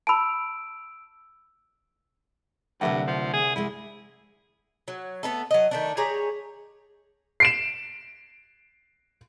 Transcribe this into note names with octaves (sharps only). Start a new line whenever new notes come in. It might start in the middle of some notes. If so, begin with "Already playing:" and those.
A5 B5 E6 D7
C2 G2 D3 F#3 A3 E5 F#5
F3
G#4
G#3 E4 G#4 D5
F#3
A3 B3 D#4 A4
F#3 D#5
D#3 A3 D4
G4 G#4 C#5 A#5
C7 D7 E7